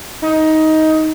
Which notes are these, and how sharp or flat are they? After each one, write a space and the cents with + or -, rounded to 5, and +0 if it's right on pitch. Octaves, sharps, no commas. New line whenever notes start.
D#4 +15